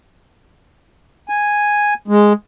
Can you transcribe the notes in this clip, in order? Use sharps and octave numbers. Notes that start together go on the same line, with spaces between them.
G#5
G#3